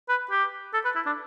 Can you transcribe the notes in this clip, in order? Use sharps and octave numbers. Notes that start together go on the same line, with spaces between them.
B4
G4
A4
B4
E4
D4